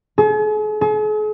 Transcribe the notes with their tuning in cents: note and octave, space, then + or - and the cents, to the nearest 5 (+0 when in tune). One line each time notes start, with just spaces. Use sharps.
G#4 +45
G#4 +45